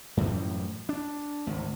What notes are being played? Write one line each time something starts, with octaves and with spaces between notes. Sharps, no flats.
F#2 A2 E3 F3
D4
G#1 D2